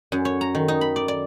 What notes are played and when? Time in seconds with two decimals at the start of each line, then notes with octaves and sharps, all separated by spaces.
0.12 F#2
0.25 C#5
0.41 A#5
0.55 D#3
0.68 D#4
0.81 B5
0.96 D5
1.08 D5